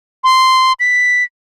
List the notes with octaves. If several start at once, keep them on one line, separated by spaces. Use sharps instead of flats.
C6
B6